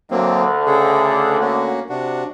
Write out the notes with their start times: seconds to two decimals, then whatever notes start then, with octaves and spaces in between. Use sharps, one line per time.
0.11 D2 D3 F#3 A#3 C4
0.66 C#3 G#4 A4
1.40 A#3 C#4 F#4
1.89 C3 D4 F#4